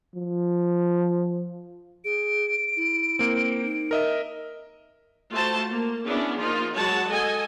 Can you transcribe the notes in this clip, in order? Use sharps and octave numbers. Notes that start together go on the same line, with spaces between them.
F3
G#4 D7
E4
A#3 C4
D#4
A#4 D#5 E5
A3 F4 F#4 C5 A5
A#3
B3 C#4 D4 E4 G#4
F3 A#3 D#4 F4
F#3 G#3 F#4 C#5 F#5 A5
A4 D#5 G#5